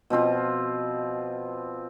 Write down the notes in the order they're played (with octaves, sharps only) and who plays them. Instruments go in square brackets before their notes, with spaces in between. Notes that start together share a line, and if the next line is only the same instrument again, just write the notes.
[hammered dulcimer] B2 F3 C4 F4